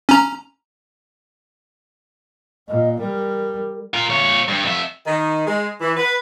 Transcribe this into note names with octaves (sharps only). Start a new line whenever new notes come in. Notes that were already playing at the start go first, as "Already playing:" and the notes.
C#4 A#5
A#2 D#5
G3 A#4
F4 A#4
A#2 C#5
G2
F2 E5
D#3
G#3
E3
B4